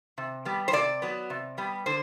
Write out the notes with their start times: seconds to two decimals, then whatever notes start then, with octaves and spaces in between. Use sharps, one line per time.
0.18 C3
0.45 G3 B3
0.68 C5
0.73 C3 D5
1.02 F#3 B3
1.30 C3
1.58 G3 B3
1.86 D3 C5